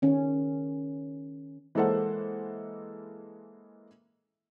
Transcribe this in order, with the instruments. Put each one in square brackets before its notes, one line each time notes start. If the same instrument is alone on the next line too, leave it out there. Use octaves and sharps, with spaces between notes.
[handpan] D#3 C#4
[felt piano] E3 G#3 A#3 A4 C5 F#5